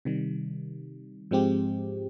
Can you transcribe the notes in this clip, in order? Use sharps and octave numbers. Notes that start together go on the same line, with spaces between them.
C3 D#3 G3
G#2 F3 G#3 C4 G4